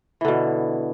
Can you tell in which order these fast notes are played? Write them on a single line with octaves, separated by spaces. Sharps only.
E3 D3 B2